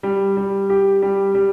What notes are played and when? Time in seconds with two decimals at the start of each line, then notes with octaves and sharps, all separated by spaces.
0.03 G3
0.37 G3
0.70 G4
1.02 G3
1.35 G3